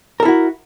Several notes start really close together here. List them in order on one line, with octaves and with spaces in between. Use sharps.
A#4 A4 E4 F#4